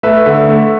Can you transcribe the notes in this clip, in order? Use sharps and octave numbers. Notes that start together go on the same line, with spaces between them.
A3 B4 E5
D3
A3